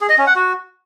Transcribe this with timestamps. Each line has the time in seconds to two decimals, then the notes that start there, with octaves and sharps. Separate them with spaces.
0.01 G#4
0.09 D#5
0.18 C#4
0.27 F#5
0.36 F#4